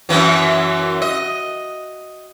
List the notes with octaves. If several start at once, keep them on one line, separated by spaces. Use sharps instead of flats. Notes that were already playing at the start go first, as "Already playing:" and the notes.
F#2 E3 F#3
D#5